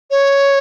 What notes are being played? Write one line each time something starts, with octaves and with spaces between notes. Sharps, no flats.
C#5